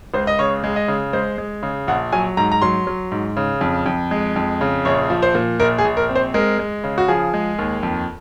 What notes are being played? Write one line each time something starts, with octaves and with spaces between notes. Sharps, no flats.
C#2 C5
D#5
C#3 C#5
G#3
D#5
C#3
G#3 C5
G#3
C#3
A#1 F#5
F#3 G#5
G#2 A#5
A#5
F#3 C6
F#3
G#2
C#3
F2
F2
G#3
F2
C#3
A#1 C#5
F3
C5
A#2
A#1 A#4
G#4
A#1
A#4
C4
C5
G#3 A#4
G#3
C#3
F#4
F3 G#4
G#3
D#2
F2